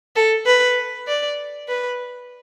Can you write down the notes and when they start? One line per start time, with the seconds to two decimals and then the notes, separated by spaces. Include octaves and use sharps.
0.16 A4
0.46 B4
1.07 D5
1.68 B4